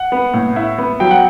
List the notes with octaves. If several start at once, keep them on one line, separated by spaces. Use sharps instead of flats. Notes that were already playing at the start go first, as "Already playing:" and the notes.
Already playing: F#5
B3
A2
E4
B3
F#3 G5
F#5